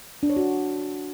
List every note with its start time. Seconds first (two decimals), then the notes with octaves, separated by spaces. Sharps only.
0.23 D4
0.30 C#5
0.36 F#4